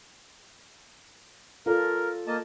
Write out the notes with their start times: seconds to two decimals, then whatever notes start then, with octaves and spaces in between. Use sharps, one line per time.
1.66 F4 A4 A#4 D5
2.27 A#3 D#5 A5